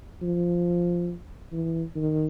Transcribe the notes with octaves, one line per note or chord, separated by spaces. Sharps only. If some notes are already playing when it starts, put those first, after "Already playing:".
F3
E3
D#3